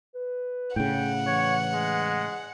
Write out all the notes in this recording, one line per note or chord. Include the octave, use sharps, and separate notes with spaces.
B4
A2 C#3 F#5 G5
E3 C#5
G#3